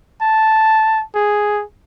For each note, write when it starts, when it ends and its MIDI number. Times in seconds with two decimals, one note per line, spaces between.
0.22 1.03 81
1.15 1.63 68